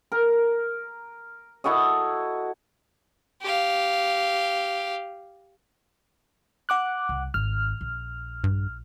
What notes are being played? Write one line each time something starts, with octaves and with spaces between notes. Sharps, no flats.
A#4
E4 F#4 A4 D#5
G4 F5
F#5 D6 F#6
C2
G#1 F6
A#1
G2